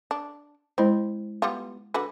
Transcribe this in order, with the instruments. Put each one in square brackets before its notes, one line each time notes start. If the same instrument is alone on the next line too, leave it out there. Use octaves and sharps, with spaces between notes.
[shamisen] D4
[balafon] G#3 E4 C5 [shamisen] C4
[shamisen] G3 B3 F4
D3 F#4 B4